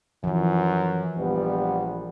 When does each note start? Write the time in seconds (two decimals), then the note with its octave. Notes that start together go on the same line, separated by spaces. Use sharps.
0.24 F#2 E3 F3
1.17 A#1 G3 B3